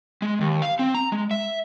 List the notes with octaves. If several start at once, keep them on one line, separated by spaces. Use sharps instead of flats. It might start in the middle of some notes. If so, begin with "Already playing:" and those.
G#3
D#2
F5
C4
A#5
G#3
E5